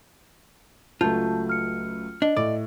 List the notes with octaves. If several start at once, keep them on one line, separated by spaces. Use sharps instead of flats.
C#2 F#3 A3 F4 A5 G6
F6 C#7
D4 D#5
A2 D5